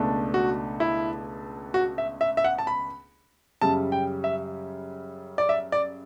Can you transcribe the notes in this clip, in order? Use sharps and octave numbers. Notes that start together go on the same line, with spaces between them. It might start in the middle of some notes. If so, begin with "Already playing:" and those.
Already playing: C#2 B2 A3 D4
F#4
E4
F#4
E5
E5
E5
F#5
A5
B5
F#2 C#3 G3 A5
G5
E5
D5
E5
D5